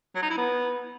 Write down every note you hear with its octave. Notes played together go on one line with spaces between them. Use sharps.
F#3
D#4
E4
B3